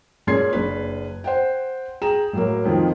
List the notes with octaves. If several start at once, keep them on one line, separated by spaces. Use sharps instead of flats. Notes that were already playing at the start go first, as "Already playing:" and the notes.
A#2 C#4 G#4 C6 G#6 C7
F#1 D4 B4
C5 F#5 G5
G#4 G5 A#5 E7
A2 F#3 A#3
F2 D#3 F3